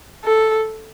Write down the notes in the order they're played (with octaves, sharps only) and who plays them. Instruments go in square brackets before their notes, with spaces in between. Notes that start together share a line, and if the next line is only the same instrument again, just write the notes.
[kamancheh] A4